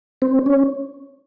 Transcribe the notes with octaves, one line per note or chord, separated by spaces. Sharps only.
C4
C#4